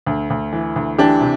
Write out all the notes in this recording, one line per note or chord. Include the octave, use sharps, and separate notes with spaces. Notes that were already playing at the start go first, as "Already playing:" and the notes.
D2
D2
E3
D2
E3 D4 G4
C3